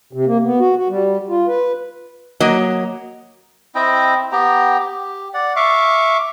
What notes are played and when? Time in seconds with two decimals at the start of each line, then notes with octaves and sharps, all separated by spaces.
0.13 C3
0.26 A#3
0.44 B3
0.59 F#4
0.76 F#4
0.90 G3
1.29 F4
1.48 B4
2.40 F#3 A#3 D#5
3.75 C4 E4 D#5 G5
4.32 B3 G4 G5 A#5
4.80 G4
5.34 D5 F#5
5.56 E5 F5 C#6 D6